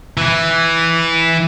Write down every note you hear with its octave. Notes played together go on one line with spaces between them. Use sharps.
E3